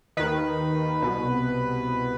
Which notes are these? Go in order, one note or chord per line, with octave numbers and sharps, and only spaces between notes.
D#2 D#3 B4
C2 B2